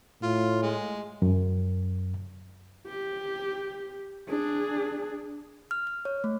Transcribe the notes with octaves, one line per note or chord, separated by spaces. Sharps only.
A2 F4
G#3
F#2
G4
D4 G#4
F6
F6
C#5
A3